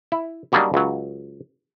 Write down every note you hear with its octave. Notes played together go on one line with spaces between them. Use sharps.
E4
C#3 F#3 G3 A#3 D4 D#4
C#2 F#3